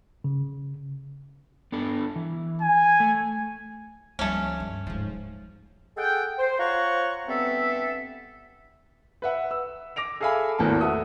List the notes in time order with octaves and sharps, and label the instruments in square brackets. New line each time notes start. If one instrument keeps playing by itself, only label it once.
[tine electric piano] C#3
[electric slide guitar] B3 D4 A4
E3
[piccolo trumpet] G#5
[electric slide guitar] A3
[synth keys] C#2 F3 G3 [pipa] A3 C#4 [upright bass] A#3
[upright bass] G2
[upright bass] D1 G#2 [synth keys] F3
[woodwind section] G#4 A4 F#5 G5
C5
F4 C5 C#5 F#5 A#5 C#6
G2 B3 C4 A4 E5
[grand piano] B4 E5 F#5
E6
D6 A#6 D7 F7
G#4 A4 E5 F5 G#5 B5
G#1 E2 A2 A#3 B3 A5
F#4 A4 E5 D#6